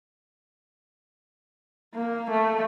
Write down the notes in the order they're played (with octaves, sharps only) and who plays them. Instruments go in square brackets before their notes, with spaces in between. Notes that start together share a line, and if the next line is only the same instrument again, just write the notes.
[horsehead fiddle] A#3
A3